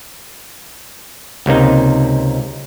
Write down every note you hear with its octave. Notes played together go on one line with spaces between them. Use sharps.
C#2 C3 A#3 D#4